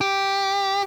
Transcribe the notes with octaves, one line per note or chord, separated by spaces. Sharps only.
G4